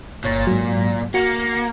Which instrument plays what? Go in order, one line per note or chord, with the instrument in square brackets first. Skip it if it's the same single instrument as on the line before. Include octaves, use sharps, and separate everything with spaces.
[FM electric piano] G1 C#5 A6 [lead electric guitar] A#2
[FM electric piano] G#2 F#3
[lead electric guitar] A#3 [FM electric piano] F#4 C#7